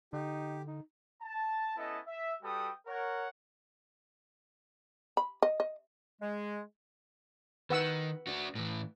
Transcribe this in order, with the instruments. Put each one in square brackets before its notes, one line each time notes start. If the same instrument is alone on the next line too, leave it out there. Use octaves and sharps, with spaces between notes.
[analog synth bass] D3 [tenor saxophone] D#4 [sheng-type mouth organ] G4
[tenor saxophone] D#4
[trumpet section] A5
B3 C#4 E4 A4 D#5 A5
E5
G3 F#4 A4 B4 G5 D#6
A#4 C#5 F#5
[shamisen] B5
D#5
D#5
[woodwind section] G#3
[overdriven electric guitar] D#3 [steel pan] B4 F#5 E6
[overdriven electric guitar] D4 F#4
A2 E3